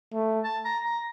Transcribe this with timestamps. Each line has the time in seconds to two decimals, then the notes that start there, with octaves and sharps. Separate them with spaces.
0.14 A3
0.44 A5
0.65 A#5
0.85 A#5